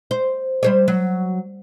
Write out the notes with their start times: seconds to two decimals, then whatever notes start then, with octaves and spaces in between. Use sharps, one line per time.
0.11 C5
0.63 G3 C5 C#5
0.88 F#3